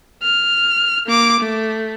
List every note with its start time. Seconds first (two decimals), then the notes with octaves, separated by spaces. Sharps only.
0.22 F6
1.07 A#3 D6
1.40 A3